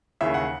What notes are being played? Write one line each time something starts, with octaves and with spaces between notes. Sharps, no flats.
D#2 C#3 E3 E5
F#5